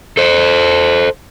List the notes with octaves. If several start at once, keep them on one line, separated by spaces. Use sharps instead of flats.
A4 C5